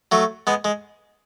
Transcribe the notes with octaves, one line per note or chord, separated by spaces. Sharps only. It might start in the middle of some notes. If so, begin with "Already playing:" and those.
F#3 A3
G#3 B3
G#3